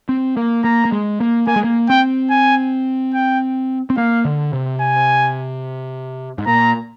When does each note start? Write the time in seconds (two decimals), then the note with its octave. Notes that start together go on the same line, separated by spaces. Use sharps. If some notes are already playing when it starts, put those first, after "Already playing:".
0.09 C4
0.37 A#3
0.64 A#3 A#5
0.85 A#3
0.92 G#3
1.20 A#3
1.47 A#3 G#5
1.56 G#3
1.64 A#3
1.89 C4 G5
2.30 G#5
3.14 G5
3.90 C4
3.97 A#3 F5
4.25 D3
4.53 C3
4.80 G#5
6.38 G#2
6.47 A#2 A#5